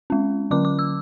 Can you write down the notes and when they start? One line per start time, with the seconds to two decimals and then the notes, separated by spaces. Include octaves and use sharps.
0.10 G#3 C#4
0.51 D3 F#3 C#4 D6
0.65 D6
0.79 E6